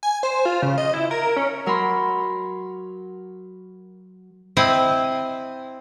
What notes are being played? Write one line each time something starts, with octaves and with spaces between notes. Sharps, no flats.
G#5
C5
F4
C#3
D#5
E4
A#4
C#4
F#3 A#4 B5 C6
C4 E4 D#5